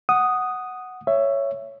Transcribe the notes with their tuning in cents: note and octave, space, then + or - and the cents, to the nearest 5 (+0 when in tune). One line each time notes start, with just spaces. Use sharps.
F#5 +0 D#6 +0
C#5 +0 E5 +15